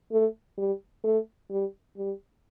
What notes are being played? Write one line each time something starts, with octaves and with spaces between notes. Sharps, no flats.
A3
G3
A3
G3
G3